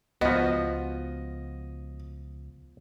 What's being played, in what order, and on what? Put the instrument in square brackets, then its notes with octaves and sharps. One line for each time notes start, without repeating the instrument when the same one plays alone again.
[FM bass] C#2 [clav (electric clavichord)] F3 B3 [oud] F#4 [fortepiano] D#5